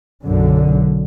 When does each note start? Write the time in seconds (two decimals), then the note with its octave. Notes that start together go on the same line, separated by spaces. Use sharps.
0.23 B1 F#2 D3